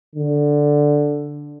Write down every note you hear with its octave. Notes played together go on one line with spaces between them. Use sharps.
D3